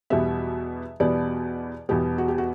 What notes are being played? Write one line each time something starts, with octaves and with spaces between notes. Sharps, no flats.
E2 B2 G3 B3 E5
E2 B2 G3 B3 D5
E2 B2 G3 B3 G4
F#4
G4
F#4